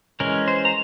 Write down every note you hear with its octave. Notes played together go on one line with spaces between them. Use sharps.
E3 G#3 C#4 A#4
C5
A#5